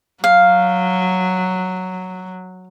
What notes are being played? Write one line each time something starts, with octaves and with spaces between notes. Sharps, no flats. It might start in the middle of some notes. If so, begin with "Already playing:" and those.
F#3 F5